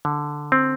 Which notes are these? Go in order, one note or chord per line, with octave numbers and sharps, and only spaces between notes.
D3
C4